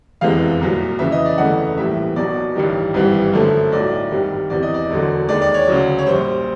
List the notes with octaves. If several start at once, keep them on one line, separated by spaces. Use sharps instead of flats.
F1 E2 C3 E3 G#3 F5
C2 A#2 F#3
F2 C#3 E3 E5
D#5
D5
G1 F2 C#3 E3 A3 F#5
A#1 A2 E3 G3 A#3 E5
B1 B2 F#3 A#3 D5
A1 G2 D#3 G3
G#1 G2 E3 G3
F#2 D3 F3 A3
B1 A2 F#3 D5
G#1 G2 D#3 G3
E2 C3 E3 D5
D#5
D5
E1 D2 D3 F#3
D#2 D#3 G#3 D5
D5
C#5
D2 C#3 F#3
C#5
A#1 A#2 G3 C5